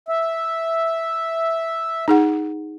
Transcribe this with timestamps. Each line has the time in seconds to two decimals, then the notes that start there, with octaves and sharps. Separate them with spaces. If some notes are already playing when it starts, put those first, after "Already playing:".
0.09 E5
2.08 D#4 G#4 F#5